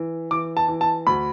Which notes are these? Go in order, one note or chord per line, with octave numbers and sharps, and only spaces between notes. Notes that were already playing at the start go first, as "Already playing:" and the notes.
Already playing: E3
E3 D6
A5
E3
A5
D2 B5